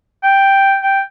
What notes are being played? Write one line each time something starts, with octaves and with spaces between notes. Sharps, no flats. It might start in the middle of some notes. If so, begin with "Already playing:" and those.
G5
G5